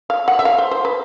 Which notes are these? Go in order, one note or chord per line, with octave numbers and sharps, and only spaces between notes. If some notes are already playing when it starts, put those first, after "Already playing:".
F5
F#5
E5
F5
C5
C5
B4